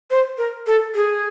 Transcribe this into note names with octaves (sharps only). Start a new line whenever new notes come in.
C5
A#4
A4
G#4